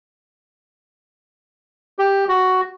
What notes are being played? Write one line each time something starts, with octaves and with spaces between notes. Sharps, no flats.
G4
F#4